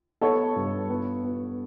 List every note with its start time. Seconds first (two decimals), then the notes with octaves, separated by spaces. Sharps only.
0.21 B3 A4 C#5
0.56 G2
0.89 B3
1.24 B3